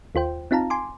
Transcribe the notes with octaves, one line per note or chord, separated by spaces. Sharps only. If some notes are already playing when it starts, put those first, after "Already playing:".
D#2 F4 C5 G5
C4 D#4 F4 F5 A5 A#5
G#5 C6 D6